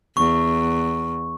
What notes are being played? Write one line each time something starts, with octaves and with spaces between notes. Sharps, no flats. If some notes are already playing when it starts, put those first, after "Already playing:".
E2 C#6